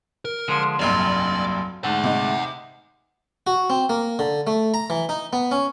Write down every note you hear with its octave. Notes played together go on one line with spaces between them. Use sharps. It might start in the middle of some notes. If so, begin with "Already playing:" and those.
A#4
D3 F3 G#3
F1 A#1 G2 F#3 F4 D5
G#2 D3 A3 E5 F#5
C3 D#4
F#4
C4
A#3
D3
A3
A#5
E3
D#4
B3
C#4